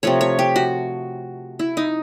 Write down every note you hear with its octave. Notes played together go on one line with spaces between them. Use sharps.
C3 F3 A3 C#5
C#5
G4
F#4
E4
D#4